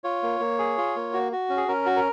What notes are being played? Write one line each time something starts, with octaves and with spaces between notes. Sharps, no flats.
F4 C#5
A#3
A#3
G#4
F4
A#3
F#4
F#4
C#4
G#4
C#4 A#4
F#4
A#4